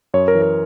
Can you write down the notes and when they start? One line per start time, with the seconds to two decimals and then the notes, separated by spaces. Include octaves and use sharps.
0.14 F#2 C#5
0.28 A#4
0.35 E3
0.42 A#4